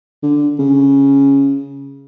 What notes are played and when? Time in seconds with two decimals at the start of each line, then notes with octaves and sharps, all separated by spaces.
0.23 D3
0.59 C#3